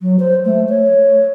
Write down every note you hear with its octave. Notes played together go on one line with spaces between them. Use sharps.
F#3
C5
A3
C#5